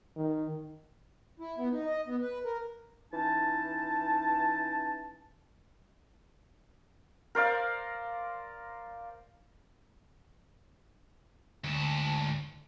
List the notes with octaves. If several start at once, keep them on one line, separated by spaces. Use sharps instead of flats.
D#3
E4
B3
D#4
D#5
B3
B4
A#4
E3 C#4 D#4 A5
A#4 C5 D5 F5
D2 G#2 A5